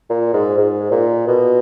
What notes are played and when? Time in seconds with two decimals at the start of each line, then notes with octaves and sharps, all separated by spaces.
0.10 A#2
0.33 G#2
0.57 G#2
0.91 A#2
1.27 B2